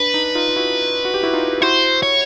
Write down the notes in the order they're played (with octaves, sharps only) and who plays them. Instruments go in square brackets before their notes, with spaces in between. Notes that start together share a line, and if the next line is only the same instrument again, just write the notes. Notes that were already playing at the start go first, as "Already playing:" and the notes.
Already playing: [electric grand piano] D4 [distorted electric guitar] B4
[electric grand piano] D#4
D#4 F4
F4
E4 F#4
F#4
G4
E4 F#4
D#4 F4
[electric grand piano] E4 F#4 [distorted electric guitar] C5
[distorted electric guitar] C#5